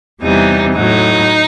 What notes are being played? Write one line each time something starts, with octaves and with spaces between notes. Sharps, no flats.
E2 C3 E3 G3 D#4
A2 F#3 D#4